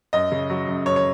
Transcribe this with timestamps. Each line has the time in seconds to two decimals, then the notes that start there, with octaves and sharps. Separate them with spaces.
0.13 F#2 D#5
0.32 C#3
0.50 F#3
0.67 F#2
0.86 F#2 C#5
0.96 C#5